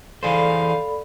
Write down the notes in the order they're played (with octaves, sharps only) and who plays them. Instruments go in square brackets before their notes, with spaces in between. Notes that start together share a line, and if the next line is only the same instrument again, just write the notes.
[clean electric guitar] E3 G#4 C5 [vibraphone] A4 D5 B5 [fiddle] F5